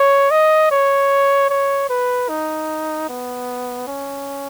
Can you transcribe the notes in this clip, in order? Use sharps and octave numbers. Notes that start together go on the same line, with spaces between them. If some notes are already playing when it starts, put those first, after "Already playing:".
Already playing: C#5
D#5
C#5
C#5
B4
D#4
B3
C#4